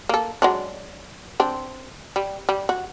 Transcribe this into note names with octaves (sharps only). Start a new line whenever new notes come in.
A#3 A4
F#3 G#3 D4
C4 D4
G3
G3
F#4